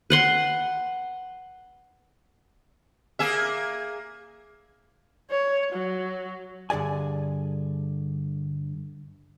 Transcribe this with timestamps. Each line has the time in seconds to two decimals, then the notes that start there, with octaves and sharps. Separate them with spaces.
0.10 B4 F#5 C6
3.19 A#3 G#4 E5
5.31 C#5
5.73 F#3
6.70 G2 D3 G#4 D5 G#5